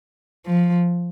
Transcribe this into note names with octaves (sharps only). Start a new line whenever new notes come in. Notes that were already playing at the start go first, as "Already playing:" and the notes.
F3